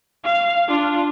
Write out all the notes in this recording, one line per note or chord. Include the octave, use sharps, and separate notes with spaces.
F5
D4 F4